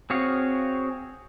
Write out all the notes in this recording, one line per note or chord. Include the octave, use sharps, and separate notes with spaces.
C4 F#4 G#4 C#5 F5